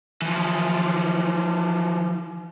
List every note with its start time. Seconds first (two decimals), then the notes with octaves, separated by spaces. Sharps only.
0.22 E3 F3